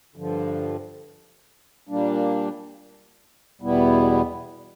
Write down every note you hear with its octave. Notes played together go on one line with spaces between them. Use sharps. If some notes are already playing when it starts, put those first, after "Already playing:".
G2 D3 F3
A#2 G3 A#3 D4
E2 B2 G3 B3 E4